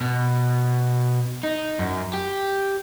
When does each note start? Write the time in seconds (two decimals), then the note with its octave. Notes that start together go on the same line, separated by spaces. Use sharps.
0.01 B2
1.43 D#4
1.79 F#2
2.14 G4